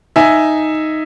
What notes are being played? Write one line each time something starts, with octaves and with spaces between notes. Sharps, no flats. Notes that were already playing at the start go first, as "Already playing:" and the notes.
D#4 E5 G#5